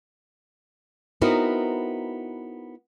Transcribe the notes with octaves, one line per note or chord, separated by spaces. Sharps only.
B3 C4 D#4 E4 F#4 A#4